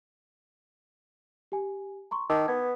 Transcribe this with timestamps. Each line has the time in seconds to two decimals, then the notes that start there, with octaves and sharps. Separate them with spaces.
1.52 G4 G#5
2.11 A#5 C6 C#6
2.30 D#3 A5 D6 E6
2.48 B3 G#6